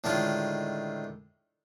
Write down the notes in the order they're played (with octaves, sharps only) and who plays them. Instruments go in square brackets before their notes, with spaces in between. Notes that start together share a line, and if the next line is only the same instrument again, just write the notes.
[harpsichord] A2 D3 D#3 G#3 F4